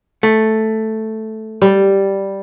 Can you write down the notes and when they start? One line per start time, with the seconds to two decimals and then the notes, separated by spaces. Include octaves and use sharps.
0.23 A3
1.62 G3